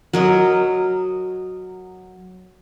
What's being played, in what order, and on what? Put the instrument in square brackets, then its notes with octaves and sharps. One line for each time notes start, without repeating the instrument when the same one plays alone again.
[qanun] F#3 A#4 D#5